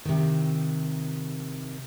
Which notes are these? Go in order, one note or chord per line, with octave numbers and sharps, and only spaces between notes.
C3 D#3